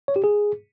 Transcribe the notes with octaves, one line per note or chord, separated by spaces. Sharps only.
C#5
G4
G#4